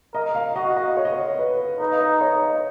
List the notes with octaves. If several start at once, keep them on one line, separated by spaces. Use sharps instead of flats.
A#4 D#5
F5
F#4 D#5
D#5
C#5
D#5
C#5
B4
D#4 B4
F5
D#5
C#5
D#5